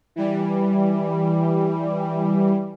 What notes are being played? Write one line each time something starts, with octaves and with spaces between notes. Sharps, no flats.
E3 G3